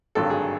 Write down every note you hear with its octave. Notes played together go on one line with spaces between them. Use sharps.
G#1 G2 D3 F#3 A#3 A4
G#4